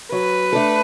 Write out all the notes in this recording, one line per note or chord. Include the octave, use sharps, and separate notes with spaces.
F#3 B4
A3 D4 A4